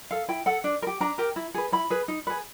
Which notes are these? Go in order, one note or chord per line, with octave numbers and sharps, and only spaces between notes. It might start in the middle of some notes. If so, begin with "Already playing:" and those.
A4 F5
E4 G5
A4 F#5
D4
A#4
G4
D4 A#5
G4 A#4
E4
G#4 B4
E4 B5
G#4 B4
D#4
G#4 B4